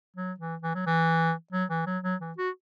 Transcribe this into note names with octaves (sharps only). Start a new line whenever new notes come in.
F#3
E3
E3
F#3
E3
F#3
E3
F#3
F#3
E3
F#4